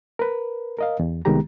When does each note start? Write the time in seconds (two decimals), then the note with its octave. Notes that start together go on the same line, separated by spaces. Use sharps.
0.19 A#4 B4
0.79 A#4 D#5 F5
0.99 E2
1.25 C2 D#3 G#3 B3 G4 A#5